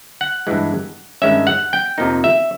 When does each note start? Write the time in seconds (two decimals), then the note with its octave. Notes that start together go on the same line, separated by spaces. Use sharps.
0.21 F#5
0.47 G2 E3 G#3
1.22 G2 D#3 G#3 C#4 E5
1.47 F#5
1.73 G5
1.98 F2 C3 F3 A#3 D#4
2.24 E5